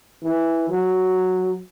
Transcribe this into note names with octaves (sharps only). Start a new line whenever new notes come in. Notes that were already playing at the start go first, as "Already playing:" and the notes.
E3
F#3